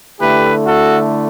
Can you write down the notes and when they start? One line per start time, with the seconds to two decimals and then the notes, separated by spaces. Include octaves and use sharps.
0.20 D3 A3 E4 G4 B4
0.66 F#4 A4